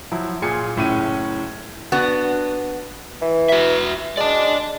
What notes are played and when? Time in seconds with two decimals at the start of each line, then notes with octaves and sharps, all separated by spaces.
0.12 F3 F#3 E4
0.42 A#2 F4 G#4 G#5 C#7
0.76 F#1 A2 C#4 D#7
1.92 B3 D4 F#4
3.22 E3
3.49 F#4 E5
4.17 G#3 D5 A5